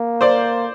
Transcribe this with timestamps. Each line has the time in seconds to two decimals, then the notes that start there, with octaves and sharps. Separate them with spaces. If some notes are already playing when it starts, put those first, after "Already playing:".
Already playing: A#3
0.21 C5 D5